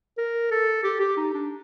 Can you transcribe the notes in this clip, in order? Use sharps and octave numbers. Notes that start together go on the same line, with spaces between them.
A#4
A4
G4
G4
D#4
D4